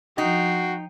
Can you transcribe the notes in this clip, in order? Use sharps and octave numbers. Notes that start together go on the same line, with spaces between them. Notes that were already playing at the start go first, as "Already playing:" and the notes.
F3 D#4 F#4 G5 C7